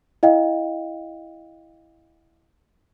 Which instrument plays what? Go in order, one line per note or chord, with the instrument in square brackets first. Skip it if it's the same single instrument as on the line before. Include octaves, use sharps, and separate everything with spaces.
[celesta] E4 D#5 F5 G5